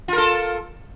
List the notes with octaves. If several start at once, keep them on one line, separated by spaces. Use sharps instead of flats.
F4 A4 A#4